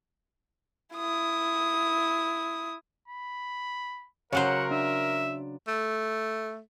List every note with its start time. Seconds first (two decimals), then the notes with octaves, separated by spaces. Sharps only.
0.95 E4 D#6
3.08 B5
4.33 C#3 F#3 A#4 C5 C#5 F#5
4.71 D4 E5
5.68 A3